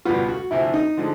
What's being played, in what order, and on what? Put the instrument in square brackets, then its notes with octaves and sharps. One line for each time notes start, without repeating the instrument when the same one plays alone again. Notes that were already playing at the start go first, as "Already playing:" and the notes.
[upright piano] C#2 B2 G3 B3 [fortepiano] F4
[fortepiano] F#4
[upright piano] D2 C3 F3 [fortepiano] E4
[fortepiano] D#4
[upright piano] D3 F3 G#3